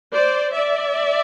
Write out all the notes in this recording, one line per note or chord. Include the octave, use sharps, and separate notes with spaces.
C5 D5
D5 E5